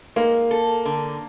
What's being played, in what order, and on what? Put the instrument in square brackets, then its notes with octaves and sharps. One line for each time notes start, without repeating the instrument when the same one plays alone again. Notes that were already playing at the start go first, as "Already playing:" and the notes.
[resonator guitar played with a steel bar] G#3 [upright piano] A#3
[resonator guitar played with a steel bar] A4
D3